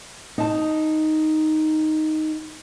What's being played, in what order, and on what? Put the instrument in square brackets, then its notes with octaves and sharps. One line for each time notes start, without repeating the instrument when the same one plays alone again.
[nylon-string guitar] D#4 A5